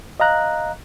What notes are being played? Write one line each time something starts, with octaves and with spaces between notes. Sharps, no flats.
D#5 F5 A#5 F#6